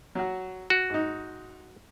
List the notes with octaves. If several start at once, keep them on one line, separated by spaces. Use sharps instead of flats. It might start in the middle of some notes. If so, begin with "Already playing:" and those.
F#3 F#4
F#4
G#2 D#4